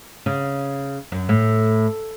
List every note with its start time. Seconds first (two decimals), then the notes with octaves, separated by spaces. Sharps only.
0.26 C#3
1.12 F#2
1.29 A2